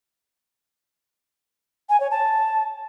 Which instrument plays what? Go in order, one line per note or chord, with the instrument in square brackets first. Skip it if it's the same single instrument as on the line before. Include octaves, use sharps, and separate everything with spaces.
[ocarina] G#5
C#5
A5